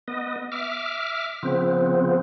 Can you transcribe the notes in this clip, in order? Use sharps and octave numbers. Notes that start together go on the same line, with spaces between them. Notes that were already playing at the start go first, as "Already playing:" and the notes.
B3 D#5
E5 D6 F6
C#3 F3 B3 C4